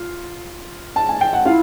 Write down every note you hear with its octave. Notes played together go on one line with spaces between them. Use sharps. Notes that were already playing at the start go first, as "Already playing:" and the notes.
Already playing: F4
A5
G#5
G5
F#5
E4 F4 F5